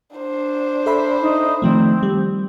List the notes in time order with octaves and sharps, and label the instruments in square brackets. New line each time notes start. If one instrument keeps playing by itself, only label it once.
[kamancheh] D4 C5
[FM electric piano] A4 E5 B5
[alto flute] D#4
[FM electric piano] D#3 F3 A3 [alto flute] C4
[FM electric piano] G3